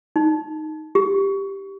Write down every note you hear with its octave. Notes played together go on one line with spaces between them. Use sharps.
D#4
G4